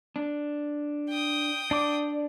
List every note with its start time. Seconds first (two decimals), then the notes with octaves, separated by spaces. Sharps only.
0.16 D4
1.09 G5 D#6
1.71 D4 D5 D6